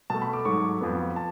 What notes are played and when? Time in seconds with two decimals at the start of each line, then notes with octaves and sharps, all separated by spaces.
0.10 B2 A3 A5
0.22 B5
0.33 D6
0.45 G#2 F#3 A3 C#6
0.81 F2 F3 B3
1.16 A5